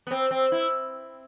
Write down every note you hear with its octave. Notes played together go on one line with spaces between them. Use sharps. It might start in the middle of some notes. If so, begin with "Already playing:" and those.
B3
C4
C4
E4